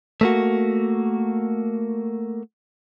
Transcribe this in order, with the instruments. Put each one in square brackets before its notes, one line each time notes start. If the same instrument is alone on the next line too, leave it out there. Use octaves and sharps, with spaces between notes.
[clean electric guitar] A3 A#3 F#4